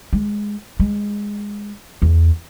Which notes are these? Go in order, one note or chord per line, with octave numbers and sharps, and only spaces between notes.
G#3
G#3
E2